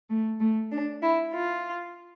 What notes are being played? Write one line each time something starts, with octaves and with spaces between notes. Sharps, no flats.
A3
A3
D4
E4
F4